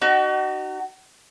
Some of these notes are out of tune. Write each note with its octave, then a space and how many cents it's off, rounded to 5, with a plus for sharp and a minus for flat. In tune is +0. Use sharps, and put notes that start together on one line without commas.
D#4 -30 F#4 +30